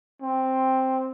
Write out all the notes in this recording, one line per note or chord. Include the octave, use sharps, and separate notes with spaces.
C4